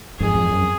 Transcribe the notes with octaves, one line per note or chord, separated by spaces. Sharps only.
F2 G#2 G#4
F2
F#2